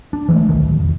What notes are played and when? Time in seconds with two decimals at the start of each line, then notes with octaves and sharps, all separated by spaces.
0.13 D4
0.29 E3 F#3 G#3 A3
0.48 D1 B1 B2 D#3
0.80 E1